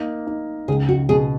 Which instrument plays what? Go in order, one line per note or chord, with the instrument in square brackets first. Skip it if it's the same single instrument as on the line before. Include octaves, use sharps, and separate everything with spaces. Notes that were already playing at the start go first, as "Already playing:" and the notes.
Already playing: [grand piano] A#3 D#4
D#4
[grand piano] C#2 [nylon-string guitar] G#4
[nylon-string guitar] F#4
[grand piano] B2 [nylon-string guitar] G#4